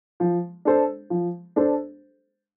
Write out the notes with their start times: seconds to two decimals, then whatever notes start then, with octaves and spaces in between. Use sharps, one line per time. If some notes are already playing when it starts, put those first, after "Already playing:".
0.20 F3
0.65 D4 A4 C5
1.10 F3
1.56 D4 A4 C5